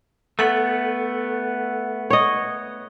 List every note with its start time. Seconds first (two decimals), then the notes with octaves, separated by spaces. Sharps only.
0.39 A3 B3 A4 F#5
2.10 C#5 D#5